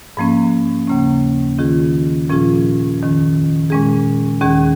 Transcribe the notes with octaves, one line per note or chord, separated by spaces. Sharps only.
G#2 F3 A#3 C#4
D#2 C#3 A#3 C#4
D#3 C#4 F4 G#4
A#2 F3 C#4 F4 G#4
F2 D#3 C#4
A#2 G#3 C#4 G#4
D#2 D#3 C#4 G#4